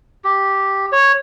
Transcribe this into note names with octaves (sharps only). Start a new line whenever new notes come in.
G4
C#5